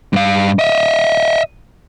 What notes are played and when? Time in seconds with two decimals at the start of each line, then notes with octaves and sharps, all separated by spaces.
0.13 G2 F5
0.59 D#5 E5